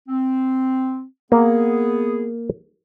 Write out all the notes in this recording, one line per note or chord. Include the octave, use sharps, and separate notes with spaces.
C4
A#3 B3 G#4